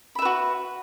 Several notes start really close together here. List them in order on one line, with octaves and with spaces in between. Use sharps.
B5 E5 B4 F#4